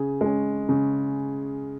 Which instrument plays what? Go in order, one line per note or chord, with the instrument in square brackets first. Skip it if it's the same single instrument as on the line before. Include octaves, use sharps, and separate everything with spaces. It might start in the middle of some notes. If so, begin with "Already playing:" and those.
Already playing: [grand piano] C#3 G#4
G#3 C#4
C#3